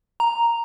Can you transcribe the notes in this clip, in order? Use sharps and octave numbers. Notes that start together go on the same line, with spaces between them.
A#5